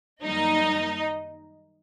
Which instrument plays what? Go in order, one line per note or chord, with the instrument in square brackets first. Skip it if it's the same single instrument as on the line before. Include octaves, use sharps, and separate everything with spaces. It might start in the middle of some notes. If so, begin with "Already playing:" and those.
[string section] F#2 D#3 G3 A#3 D#4 D#5